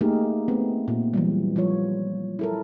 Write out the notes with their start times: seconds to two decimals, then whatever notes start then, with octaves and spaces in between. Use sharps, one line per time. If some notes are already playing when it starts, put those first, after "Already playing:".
0.01 A3 A#3 D#4 G4 G#4 A#4
0.48 A3 B3 C4
0.88 A#2
1.14 E3 F#3 G3
1.56 F3 G3 F4 C#5
2.39 E4 A4 A#4